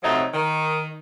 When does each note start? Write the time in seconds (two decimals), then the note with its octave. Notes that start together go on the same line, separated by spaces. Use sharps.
0.03 C3 F3 F#3 A3 D#4
0.33 D#3